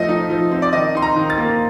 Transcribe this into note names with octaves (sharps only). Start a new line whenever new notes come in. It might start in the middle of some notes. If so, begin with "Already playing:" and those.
Already playing: F3 A3 D#5
D#4
F3
C4
D5
D#3 D#5
D#4 C6
A#5
D#3
A6
A#3